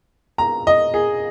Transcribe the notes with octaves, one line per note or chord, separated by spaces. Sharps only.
A#5
D#5
G#4